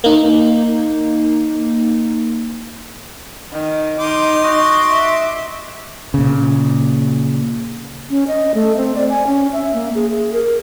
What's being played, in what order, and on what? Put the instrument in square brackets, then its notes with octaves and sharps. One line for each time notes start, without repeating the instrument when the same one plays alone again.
[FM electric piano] A#3 D#4
[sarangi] D#3
[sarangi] D#4 [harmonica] C6 D6
[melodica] F#4 D#5
[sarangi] E5
[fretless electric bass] A#2 C#3
[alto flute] C#4
D#5
A3
C4
D5
G#5
C#4
E5
A#3
G#4
G#4
A#4